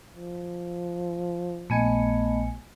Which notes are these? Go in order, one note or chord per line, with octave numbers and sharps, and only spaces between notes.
F3
A#1 A3 B3 D#5 G#5 C#7